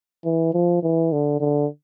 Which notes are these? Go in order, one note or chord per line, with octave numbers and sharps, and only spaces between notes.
E3
F3
E3
D3
D3